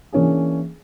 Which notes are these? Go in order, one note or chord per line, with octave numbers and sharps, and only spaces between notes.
E3 A#3 C#4 D4 G#4